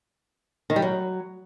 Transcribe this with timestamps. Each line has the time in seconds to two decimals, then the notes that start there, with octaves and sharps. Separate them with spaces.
0.70 D#3
0.76 G3
0.82 F#3